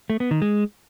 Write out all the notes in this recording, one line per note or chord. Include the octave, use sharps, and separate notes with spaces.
A3
B3
D#3
G#3